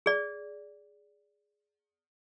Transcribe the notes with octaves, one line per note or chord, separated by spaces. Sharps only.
G#4 D5